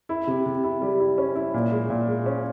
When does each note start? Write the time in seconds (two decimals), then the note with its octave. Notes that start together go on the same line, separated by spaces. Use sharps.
0.09 E4
0.27 C3
0.46 C3
0.64 E4
0.82 G3
1.00 E4
1.18 C#4
1.35 E4
1.54 A#2
1.71 G#3
1.90 A#2
2.08 G#3
2.26 C#4